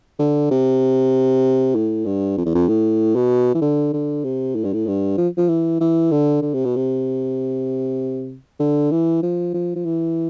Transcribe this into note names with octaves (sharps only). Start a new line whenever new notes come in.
D3
C3
A2
G2
F2
E2
F2
A2
B2
E3
D3
D3
C3
A2
G2
A2
G2
F3
F3
E3
E3
D3
D3
C3
B2
C3
D3
E3
F3
F3
F3
E3